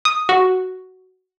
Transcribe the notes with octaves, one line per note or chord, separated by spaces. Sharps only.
D#6
F#4